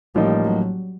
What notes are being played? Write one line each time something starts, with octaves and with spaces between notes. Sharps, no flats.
A1 A2 F3 G3 A#3 D#4
F#3